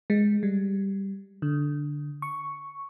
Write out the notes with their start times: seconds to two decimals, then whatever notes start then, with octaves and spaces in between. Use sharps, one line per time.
0.10 G#3
0.43 G3
1.42 D3
2.22 C#6